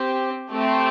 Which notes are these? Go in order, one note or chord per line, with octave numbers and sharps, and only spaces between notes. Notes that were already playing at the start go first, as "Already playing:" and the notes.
Already playing: C4 G4
A3 C4 G4